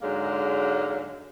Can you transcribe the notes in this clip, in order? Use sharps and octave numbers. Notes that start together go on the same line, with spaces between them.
G#2 D3 F#3 G#3 A#3